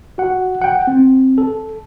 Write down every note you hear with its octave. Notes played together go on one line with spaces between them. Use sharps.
F#4 F#5
F#5 G5
C4
A4